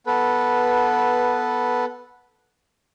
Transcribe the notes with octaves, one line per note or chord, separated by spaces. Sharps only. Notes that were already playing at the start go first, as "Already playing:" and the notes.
B3 A4 B4